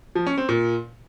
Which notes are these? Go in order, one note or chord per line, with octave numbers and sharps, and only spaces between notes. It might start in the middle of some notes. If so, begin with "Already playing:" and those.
F3
C#4
C4
A#2